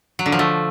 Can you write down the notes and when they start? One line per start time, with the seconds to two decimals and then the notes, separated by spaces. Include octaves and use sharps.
0.19 F#3
0.26 D3
0.32 F3
0.39 A3